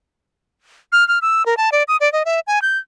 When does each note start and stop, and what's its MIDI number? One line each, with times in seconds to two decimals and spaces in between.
0.92 1.07 89
1.08 1.19 89
1.22 1.46 88
1.46 1.57 70
1.57 1.70 81
1.72 1.83 74
1.88 1.97 87
2.01 2.11 74
2.13 2.23 75
2.25 2.40 76
2.47 2.62 80
2.62 2.78 91